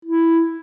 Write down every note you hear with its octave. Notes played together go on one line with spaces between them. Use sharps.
E4